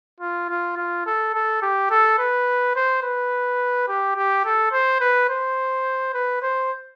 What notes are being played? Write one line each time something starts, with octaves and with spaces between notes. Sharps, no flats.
F4
F4
F4
A4
A4
G4
A4
B4
C5
B4
G4
G4
A4
C5
B4
C5
B4
C5